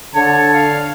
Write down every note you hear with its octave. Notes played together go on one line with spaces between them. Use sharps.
D3 C#5 A5
F5